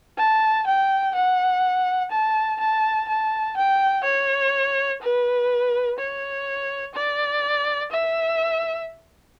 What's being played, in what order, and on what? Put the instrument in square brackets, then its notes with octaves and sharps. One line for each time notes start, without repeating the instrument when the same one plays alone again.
[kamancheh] A5
G5
F#5
A5
A5
A5
G5
C#5
B4
C#5
D5
E5